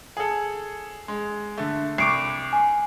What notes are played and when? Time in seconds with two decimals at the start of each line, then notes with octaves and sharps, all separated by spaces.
0.17 G#4 A4
1.08 G#3
1.58 D3 A3
1.98 C2 C#6 D6 C7 D7
2.53 G#5